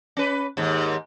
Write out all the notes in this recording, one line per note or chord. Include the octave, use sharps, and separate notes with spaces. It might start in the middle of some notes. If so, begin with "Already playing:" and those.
C#4 B4
D#2 G#2